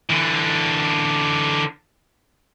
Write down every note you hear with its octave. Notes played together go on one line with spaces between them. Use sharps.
D3 E3